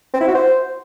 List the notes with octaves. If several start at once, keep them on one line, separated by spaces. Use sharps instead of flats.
C4
E4
F#4
C5